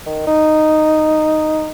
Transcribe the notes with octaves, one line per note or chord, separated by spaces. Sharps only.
D#3
D#4